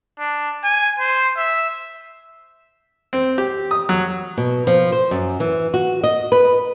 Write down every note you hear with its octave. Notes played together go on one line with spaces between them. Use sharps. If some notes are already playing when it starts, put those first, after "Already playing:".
D4
G#5
C5
E5
C4
G4
D#6
F#3
B2
F3
C5
F#2
E3
F#4
D#5
B4